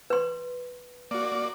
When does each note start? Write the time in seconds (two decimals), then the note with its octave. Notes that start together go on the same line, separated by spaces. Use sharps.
0.10 B4 C6
1.11 A#3 F#4 D5